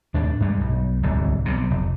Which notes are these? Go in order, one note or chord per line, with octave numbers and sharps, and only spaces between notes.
D#2 A2 D4
G2 G3 G#3
B1
D1 C2 G#2
B1 C3
F1